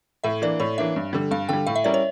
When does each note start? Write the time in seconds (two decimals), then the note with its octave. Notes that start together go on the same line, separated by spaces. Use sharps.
0.24 A2 E5
0.42 E3 A#3 D4 D5
0.60 A2 C#5
0.78 E3 A#3 D4 E5
0.96 G2
1.13 D3 G3
1.31 G2 F5
1.49 D3 G3 G5
1.67 A2 F5
1.76 E5
1.84 G3 C#4 E4 A#4 D5
1.94 C#5